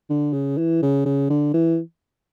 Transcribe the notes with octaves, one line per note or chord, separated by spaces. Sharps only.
D3
C#3
E3
C#3
C#3
D3
E3